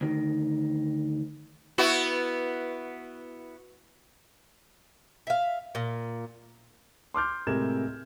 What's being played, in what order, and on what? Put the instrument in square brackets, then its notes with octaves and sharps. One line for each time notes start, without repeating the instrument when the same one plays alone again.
[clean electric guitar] D2 D#3
[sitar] B3 E4 F#4
[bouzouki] E5 F5
A#2
[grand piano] C6 D6 F6 G6
A2 C3 G#3 A#4 G#6 E7